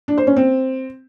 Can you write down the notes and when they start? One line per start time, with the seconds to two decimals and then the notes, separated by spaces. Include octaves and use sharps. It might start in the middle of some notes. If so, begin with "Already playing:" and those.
0.08 D4
0.18 C5
0.27 C#4
0.36 C4